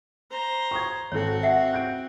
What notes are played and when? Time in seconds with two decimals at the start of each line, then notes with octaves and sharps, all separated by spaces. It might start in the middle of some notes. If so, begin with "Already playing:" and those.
0.31 C5 A#5
0.71 C#6 D#6 G#6
1.12 G#1 C4 F#4 A4 C#5
1.43 E5 F#5
1.73 F#6 G6 D7